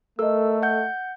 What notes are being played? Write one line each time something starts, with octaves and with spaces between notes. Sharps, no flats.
A3 A4 A#4 D#5 E6
F#5 G6